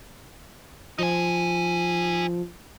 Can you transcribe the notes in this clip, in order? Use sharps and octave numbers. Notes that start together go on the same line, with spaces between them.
F3 D#4 G#5